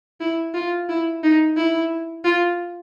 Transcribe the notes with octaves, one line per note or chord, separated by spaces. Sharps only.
E4
F4
E4
D#4
E4
F4